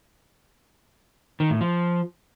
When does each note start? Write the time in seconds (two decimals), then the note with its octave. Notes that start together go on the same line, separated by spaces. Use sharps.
1.40 D#3
1.50 A2
1.61 F3